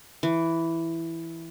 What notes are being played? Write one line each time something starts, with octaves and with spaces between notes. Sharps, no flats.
E3